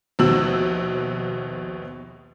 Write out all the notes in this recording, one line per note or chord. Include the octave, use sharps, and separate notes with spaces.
A#1 D#2 B2 E6 F#7